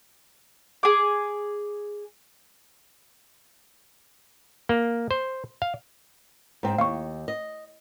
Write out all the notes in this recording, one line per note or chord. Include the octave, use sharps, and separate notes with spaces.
G#4 D6
A#3
C5
F5
G#2 C4
D#2 F5 C#6
D#5